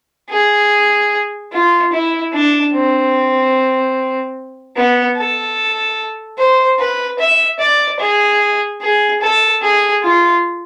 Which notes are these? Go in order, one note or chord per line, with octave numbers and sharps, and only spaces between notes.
G#4
F4
E4
D4
C4
B3
A4
C5
B4
E5
D5
G#4
G#4
A4
G#4
F4